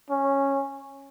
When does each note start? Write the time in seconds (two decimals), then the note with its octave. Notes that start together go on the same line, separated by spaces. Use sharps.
0.10 C#4